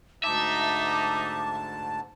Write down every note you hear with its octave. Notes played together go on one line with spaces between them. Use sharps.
D2 G#2 D#4 E5 A5 D6